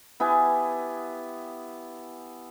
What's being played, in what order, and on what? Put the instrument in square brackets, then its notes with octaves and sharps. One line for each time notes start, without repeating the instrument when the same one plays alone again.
[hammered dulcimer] B3 E4 G4 G#5